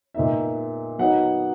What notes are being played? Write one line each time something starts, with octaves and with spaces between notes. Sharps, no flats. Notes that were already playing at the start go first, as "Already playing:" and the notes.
A#2 G#3 B3 D#4 E5
F#3 B3 D#4 F#5